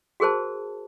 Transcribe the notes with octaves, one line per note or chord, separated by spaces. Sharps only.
F#4 G#4 A#4 C5 A5